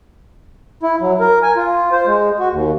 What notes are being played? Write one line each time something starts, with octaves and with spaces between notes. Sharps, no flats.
E4
F#3
A#4
G#5
F4
C5
G#3
F#4
D#2